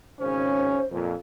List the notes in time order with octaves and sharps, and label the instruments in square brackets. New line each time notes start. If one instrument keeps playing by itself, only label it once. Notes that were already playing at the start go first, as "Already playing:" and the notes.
[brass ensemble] G#1 C#3 C#4 [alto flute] C5
[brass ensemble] F2 A#2